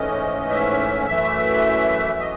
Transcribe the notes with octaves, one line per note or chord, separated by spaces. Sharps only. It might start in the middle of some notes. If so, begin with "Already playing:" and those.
Already playing: G#2 E3 A3 C#4 D#5
E5
F#2 E3 A3 E5
D#5